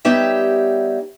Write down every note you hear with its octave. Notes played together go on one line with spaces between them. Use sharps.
G3 B3 D#4 G4 C#5 E5